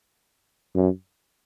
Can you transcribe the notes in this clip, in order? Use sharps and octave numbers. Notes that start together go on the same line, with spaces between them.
F#2